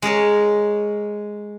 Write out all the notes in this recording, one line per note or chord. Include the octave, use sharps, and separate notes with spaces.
G#3 G#4 A#4 C#5